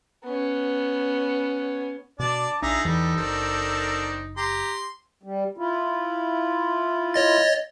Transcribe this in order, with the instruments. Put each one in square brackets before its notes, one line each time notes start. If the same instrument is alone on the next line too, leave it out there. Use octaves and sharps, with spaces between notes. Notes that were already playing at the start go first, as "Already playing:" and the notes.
[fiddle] B3 C#4
[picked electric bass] B2 [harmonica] D4 D5 [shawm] A5 [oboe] D6
[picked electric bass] A#1 D4 [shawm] D#4 [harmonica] F4 G#4 A#5 [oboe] E5
[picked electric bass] E2 E3 [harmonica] G3 [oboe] A4
[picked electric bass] F#1 [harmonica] C4 D4 A#4
[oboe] G4 [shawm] A#5 [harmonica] C6
[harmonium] G3
E4 F4
[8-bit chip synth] C#5 D#5 A6